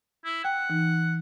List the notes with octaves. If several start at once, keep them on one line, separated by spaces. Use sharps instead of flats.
E4
F#5 G5
E3 D#4